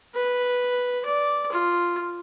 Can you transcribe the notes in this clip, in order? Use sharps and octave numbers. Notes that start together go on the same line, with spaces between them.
B4
D5
F4